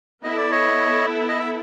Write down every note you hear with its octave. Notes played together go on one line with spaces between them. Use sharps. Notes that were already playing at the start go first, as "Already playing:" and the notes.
B3 E4 A4 D#5
D5
C#5 D#5
D#5
E5